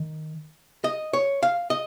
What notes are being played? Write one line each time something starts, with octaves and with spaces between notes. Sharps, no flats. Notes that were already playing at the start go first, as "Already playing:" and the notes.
Already playing: D#3
D#5
C#5
F5
D#5